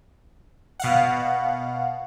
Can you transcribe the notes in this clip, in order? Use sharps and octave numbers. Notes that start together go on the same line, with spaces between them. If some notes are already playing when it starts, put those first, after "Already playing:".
B2 F5 F#5